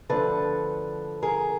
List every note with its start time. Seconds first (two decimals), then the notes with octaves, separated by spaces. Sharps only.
0.09 D2 D3 F3 A4 B4
1.22 G#4 A#4